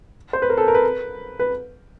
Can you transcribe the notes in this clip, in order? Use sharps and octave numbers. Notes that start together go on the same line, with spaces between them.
C5
B4
A#4
A4
A#4
B4
B4